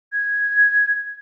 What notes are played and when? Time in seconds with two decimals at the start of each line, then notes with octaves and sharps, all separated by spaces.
0.12 G#6